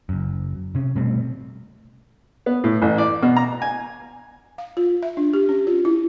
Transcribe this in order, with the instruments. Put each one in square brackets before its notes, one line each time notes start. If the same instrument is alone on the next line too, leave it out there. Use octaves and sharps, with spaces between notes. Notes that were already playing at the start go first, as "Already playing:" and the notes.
[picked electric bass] F#1 F#2
C3 C#4
B2 G3 A3 C4
[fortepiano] B3
A2
A1
D5
B2
A#5
G#5
[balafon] F5
F4
E5
D4
G4
C#4
F4
E4